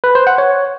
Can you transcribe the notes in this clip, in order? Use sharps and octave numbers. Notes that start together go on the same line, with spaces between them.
B4
C5
F#5
C#5